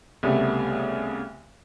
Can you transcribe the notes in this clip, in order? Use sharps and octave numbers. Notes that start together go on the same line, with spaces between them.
C2 C#3 G3 A3 B3